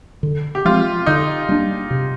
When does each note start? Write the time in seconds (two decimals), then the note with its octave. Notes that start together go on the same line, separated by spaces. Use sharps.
0.23 D3
0.55 G4
0.65 F3 G#3 C4 F4
1.06 D3 D#4
1.49 G3 A#3 D4
1.91 C3